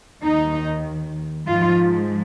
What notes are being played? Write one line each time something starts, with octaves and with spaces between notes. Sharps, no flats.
D#2 D#3 D#4
G#2 F3 F4